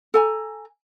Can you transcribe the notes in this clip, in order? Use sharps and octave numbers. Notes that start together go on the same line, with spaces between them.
A4 G#5 A#5